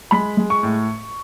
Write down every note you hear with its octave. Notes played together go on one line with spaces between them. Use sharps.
G#3 B5
G#3
C#6
A2